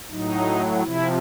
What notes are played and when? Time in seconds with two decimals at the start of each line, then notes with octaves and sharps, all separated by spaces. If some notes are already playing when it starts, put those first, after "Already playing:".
0.10 A2 F#3 D#4
0.82 C3 F3 E4